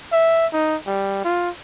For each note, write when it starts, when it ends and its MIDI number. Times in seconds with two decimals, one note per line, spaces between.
0.12 0.47 76
0.52 0.77 63
0.87 1.23 55
1.25 1.50 65